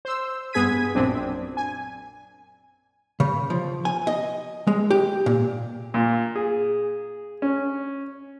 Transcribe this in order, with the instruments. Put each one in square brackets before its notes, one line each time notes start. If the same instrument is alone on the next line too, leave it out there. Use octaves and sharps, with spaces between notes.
[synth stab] C5 E6
G2 B3 G#4 G#6 B6 D#7
A#1 F#2 C4 D4
G#5
[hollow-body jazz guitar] C#3
F3
G#5
D#5
G#3
G4
A#2
[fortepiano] A#2
G#4
C#4